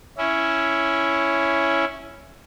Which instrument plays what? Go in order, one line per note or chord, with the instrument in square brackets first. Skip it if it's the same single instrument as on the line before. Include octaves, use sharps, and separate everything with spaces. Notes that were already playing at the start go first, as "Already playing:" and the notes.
[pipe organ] C#4 E4